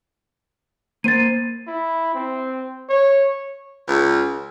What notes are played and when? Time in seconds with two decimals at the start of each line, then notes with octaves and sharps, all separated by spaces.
1.04 A#3 C5 A6 D#7
1.67 E4
2.15 C4
2.89 C#5
3.88 C#2